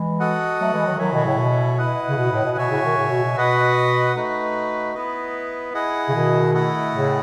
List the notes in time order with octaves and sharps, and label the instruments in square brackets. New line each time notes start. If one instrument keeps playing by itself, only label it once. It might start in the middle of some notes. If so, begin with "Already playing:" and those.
Already playing: [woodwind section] E3 G#3
[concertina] F#4 A4 D#5 F#5
[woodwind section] F#3 A3
E3 G#3
D#3 F#3
[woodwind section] D#3 F#3 [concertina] E4 A4 C#5 E5 G#5
[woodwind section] B2 D#3
A2 C#3
B2
[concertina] E4 B4 D#5 F#5
[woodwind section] C#3
B2
A2
B2
[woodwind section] B2 [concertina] F#4 C#5 E5 G#5
[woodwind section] A2 C#3
B2 D#3
A2 C#3
B2
B2
[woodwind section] B2 [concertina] F#4 B4 D#5 F#5
[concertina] A3 D#4 F#4 B4
B3 E4 B4 D#5
E4 G#4 D#5 F#5
[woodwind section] C#3
B2 D#3
[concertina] A3 E4 A4 D#5 F#5
[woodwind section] A2 C#3